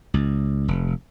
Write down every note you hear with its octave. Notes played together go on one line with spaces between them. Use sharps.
C#2
F1